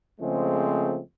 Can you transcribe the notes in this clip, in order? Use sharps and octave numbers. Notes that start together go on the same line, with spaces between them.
C#3 F3 G#3 A3 C4